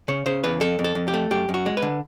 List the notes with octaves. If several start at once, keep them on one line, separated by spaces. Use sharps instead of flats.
C#3 C#5
C#3 C5
E2 B4
F2 A4
F2
A4
F2
G4
A3
F#2 G4
F#2
F#4
G#3
B4
D3